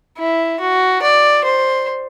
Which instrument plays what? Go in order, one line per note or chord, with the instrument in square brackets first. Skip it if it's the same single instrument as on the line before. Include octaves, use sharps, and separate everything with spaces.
[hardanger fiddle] E4
F#4
D5
C5